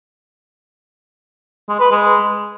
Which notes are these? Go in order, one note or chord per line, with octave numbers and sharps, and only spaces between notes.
G#3
B4
G#3